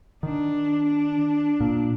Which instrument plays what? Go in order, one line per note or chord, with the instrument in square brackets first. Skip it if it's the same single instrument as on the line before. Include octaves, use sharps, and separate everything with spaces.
[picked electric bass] D#3 [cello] D4
[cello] D4
[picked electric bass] A#2